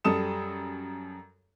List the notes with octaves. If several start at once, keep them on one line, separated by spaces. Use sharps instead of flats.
F#2 G3 A4 D#6 E7